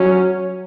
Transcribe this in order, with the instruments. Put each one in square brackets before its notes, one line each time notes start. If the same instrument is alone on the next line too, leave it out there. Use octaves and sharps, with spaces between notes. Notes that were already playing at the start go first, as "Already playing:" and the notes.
Already playing: [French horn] F#3 [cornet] C#4